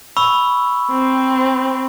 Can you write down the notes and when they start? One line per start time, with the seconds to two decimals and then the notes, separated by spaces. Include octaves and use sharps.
0.17 B5 C#6 E6
0.90 C4